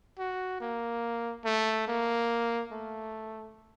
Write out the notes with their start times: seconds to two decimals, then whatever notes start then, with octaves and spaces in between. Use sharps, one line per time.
0.19 F#4
0.60 A#3
1.45 A3
1.88 A#3
2.72 A3